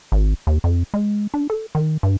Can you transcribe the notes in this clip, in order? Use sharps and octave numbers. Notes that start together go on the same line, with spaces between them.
G#1
D#2
F2
G#3
D4
A4
D#3
G2